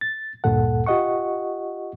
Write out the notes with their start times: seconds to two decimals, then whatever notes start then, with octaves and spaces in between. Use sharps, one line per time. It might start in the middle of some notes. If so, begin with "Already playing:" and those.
0.01 A6
0.44 D2 G2 A#2 A4 F#5
0.86 F4 G4 D#5 F#5 C#6